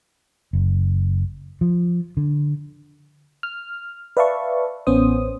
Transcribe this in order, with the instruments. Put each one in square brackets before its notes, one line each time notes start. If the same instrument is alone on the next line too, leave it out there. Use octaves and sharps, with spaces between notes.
[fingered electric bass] F#1
F3
D3
[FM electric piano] F6
B4 D5 E5 F5 A5 C#6
A1 B3 C#4 C5 D#6